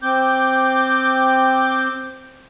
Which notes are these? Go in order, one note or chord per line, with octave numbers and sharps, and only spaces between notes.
C4 D6 G6